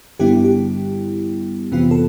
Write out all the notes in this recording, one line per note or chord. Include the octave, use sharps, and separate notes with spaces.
G2 D3 G3 B3 E4 G4
G4
F2 C3 E3 B3 F4
A4